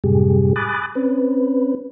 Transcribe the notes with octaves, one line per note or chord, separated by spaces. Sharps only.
F#2 A2 C3 G3 G4 G#4
G#5 B5 D6 D#6 F#6 A6
C4 C#4 B4